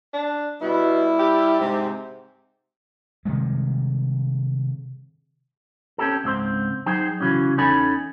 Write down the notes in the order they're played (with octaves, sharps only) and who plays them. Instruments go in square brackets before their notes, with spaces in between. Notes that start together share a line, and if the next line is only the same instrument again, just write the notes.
[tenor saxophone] D4
[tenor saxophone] B2 [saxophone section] G3 E4
[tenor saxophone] G4
[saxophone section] G#2 C3
[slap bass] C3 D#3 G3 G#3
[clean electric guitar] C4 C#4 G4 A4
C#2 G#2 C4 C5
F#3 D#4 G#4 C5 G5
C#3 E3 F#3 C#4
E2 C#4 D#4 A4 G#5 B5